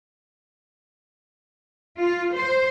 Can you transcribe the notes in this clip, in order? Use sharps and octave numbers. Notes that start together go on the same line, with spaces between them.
F4
C5